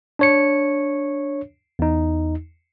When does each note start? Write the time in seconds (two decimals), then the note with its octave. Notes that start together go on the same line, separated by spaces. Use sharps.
0.19 D4 C#5 C#7
1.79 E2 D#4